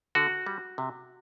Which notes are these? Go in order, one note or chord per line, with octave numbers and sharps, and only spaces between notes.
D3 F#4
G3
C3